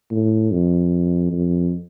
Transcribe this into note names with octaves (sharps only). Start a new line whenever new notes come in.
A2
F2
F2